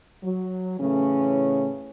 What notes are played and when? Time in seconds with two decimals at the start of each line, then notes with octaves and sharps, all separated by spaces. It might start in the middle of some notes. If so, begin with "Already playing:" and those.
0.23 F#3
0.79 A2 C#3 E3 A3 C#4